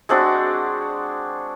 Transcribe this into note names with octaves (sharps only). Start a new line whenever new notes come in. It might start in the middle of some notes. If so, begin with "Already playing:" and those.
G#3 C4 D4 F#4